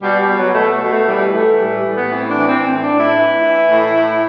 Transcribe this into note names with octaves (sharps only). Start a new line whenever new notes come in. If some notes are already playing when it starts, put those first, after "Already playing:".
B2 G3
G3
B2
F#3
B2 A3
A3
B2
A3
E3 G3
E3 A3
A2 G3
G3
A2
B3
E3 C4
D4
E3
C4
A2 C4
D4
A2
E4
E3
E3
A2
A2